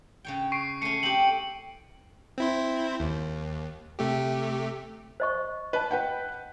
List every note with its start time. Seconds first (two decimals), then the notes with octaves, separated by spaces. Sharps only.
0.25 C#3 C#5 G5
0.52 C#6 C7 D7
0.82 A3 C#4 C#7 D#7
1.03 C4 G4 F#7
2.38 C4 E4 C5
3.00 D#2
3.99 C3 A3 G4
5.20 C5 D#5 C#6
5.73 B4 D#5 A5
5.91 B4 F#5 G5